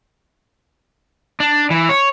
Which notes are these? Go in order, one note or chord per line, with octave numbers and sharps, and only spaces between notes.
D4
E3
C#5